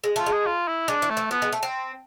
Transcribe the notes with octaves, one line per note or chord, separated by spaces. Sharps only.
G#3
A3 F4
G#3
G#4
F4
E4
G#3 D4
E3
A3
E3
F3 B3
G#3
A3
C4